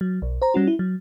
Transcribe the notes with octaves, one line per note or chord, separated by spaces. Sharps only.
F#3
B1
C5 A#5
G3 C#4 F#4
E4
F#3